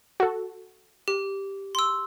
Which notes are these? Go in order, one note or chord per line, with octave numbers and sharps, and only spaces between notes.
F#4 A4
G4
C6 E6